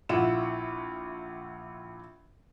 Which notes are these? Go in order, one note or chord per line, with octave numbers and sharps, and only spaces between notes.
A#1 E4 F4 F#5 E7